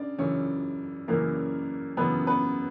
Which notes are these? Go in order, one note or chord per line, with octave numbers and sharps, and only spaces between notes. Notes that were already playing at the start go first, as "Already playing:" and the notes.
Already playing: C#3 D4 D5
F#2 C#3 E3 C#4 C#5
F#2 C#3 E3 A#3 A#4
F#2 C#3 E3 B3 B4
B3 B4